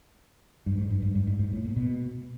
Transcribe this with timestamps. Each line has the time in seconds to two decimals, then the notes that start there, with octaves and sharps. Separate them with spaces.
0.66 G2
0.78 G#2
0.90 G2
1.02 G2
1.15 G2
1.27 G#2
1.39 G#2
1.53 A2
1.65 A#2
1.77 B2